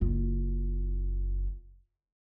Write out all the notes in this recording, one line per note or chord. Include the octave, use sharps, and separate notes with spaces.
F#1 F4